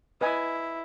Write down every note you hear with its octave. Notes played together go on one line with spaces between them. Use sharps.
E4 B4 D#5 G#5